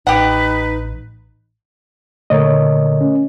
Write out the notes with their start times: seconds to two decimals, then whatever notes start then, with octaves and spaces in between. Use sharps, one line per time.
0.07 A1 D#4 G4 B4 F#5
2.30 A#2 D3 A3 A#4 C#5 D#5
3.01 C#4